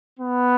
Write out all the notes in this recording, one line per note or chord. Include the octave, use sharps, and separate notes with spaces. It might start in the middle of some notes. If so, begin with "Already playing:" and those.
B3